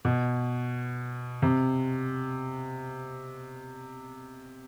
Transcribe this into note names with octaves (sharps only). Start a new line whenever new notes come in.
B2
C3